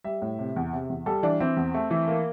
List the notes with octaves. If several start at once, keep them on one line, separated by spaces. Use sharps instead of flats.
G3 E5
A2
C3
E2
C3
E2
G3 A4
E3 D4
E3 C4
E2
A3
E3
A#3